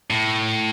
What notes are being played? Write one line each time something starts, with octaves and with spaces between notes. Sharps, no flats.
A2